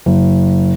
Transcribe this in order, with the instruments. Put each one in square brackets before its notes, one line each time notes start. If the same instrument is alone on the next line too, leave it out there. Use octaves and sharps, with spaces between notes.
[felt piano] F#1